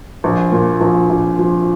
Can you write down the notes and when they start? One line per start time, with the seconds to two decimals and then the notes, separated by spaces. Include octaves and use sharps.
0.24 A#1
0.52 A#2
0.81 A#1
1.09 A#1
1.39 F3